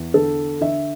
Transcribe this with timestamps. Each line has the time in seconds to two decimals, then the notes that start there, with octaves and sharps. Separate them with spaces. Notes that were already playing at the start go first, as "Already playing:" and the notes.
Already playing: E2
0.14 D3 A4
0.61 D3 E5